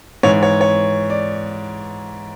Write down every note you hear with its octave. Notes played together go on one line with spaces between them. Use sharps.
G#2 E3 C#5
C#5
C#5
D5